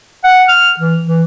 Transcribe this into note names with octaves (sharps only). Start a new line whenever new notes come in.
F#5
F6
E3
E3